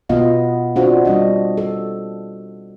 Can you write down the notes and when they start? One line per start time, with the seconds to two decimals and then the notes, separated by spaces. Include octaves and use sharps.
0.09 B2 B3 F4 D#5 F5
0.76 C4 D4 F4 F#4 C5
1.05 G3 D4 D#5
1.57 A4